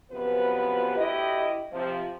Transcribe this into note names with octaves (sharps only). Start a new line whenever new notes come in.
F#2 C3 F3 B3 B4
D2 E4 G4 D#5
C3 F3